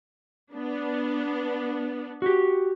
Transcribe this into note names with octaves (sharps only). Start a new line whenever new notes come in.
B3 D4
F#4 G4